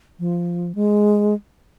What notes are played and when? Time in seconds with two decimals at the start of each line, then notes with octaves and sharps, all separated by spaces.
0.19 F3
0.75 G#3